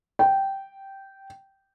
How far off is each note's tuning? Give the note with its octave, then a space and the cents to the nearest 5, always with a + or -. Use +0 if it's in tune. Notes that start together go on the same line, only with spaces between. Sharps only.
G5 -10